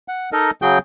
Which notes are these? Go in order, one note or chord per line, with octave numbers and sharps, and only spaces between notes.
F#5
D#4 A4 A#4 D#5
C#3 F#3 F#4 G#4 G5 G6